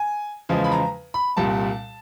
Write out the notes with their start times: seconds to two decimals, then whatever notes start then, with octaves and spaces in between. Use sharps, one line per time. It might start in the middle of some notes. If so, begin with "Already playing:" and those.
Already playing: G#5
0.49 E2 C#3 F3 G#3
0.64 B5
0.72 A#5
1.14 B5
1.37 C2 A#2 G3 A5